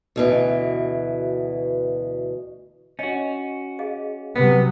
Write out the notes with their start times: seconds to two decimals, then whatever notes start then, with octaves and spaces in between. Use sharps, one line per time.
0.16 D2 B2 E3
2.99 C#4 D4 F#4 D#5
3.79 G#4 D#5 F5
4.36 C3 F#3 B3 B4